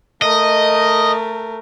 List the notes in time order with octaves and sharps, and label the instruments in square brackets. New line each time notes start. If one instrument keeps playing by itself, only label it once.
[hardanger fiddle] A3 A#4 [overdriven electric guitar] D#5